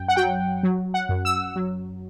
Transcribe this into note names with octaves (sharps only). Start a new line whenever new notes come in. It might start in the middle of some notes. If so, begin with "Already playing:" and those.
Already playing: F#2 G5
F#5
F#3 G5
F#3
F#5
F#2
E6
F#3